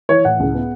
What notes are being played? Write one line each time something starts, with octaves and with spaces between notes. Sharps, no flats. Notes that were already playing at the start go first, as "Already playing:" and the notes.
E3 C#5
A2 F#5
C#2
B3